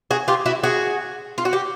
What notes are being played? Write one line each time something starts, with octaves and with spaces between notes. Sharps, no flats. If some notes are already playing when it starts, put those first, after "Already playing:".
F#4 G#4
F4 G4
E4 F#4
F#4 G#4
F4
F#4
G4